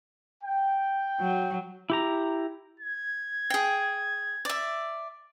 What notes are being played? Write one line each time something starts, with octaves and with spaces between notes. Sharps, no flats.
G5
F#3
E4 G4 A#5
G#6
G#4 G5
D5 E5